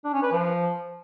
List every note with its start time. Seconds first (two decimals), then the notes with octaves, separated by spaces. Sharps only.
0.04 D4
0.14 C#4
0.23 B4
0.32 F3